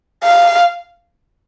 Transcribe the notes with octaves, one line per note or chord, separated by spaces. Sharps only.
F5